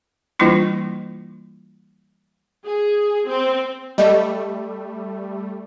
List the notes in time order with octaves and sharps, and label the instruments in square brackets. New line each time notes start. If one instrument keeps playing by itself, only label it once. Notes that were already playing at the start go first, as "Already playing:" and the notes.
[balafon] E3 G3 A#3 D4 E4 F4
[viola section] G#4
C4
[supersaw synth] G3 A3 [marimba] D#5